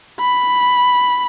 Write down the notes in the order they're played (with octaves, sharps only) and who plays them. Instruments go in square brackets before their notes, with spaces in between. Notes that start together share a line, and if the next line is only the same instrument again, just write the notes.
[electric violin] B5